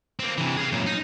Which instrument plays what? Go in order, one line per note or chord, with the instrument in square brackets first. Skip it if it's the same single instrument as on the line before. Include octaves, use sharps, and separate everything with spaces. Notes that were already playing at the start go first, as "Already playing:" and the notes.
[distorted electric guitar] A#3 C4
C3 E3
G#4 F5
F#2 A#2
D#4